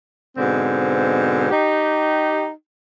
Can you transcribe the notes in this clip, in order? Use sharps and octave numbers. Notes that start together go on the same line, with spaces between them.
G#2 B2 D3 C4
D#4 G4